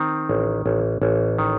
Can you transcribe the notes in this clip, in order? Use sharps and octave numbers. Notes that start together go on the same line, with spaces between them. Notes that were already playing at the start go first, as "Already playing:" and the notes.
Already playing: D#3 C4
A1
A1
A1
D#3